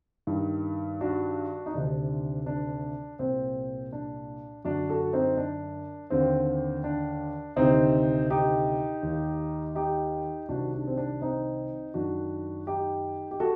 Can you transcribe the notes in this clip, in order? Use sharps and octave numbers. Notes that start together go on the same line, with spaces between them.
G2 D#3
D4 F#4
D#4
D2 C3 D#3 D4
D4
C2 A#2 C4
D4
F#2 D3 D4 F#4
F#4 A4
C4 D#4
D4
D#2 D3 C4
D4
D2 C3 D#3 C4 D#4
D#4 G4
D#2 D#3
D#4 G4
C2 C3 D#3 D4 F#4
D4
C4
D4
C4 D#4
F#2 D#3 D4 F#4
D#4 G4
G4
F#4 A4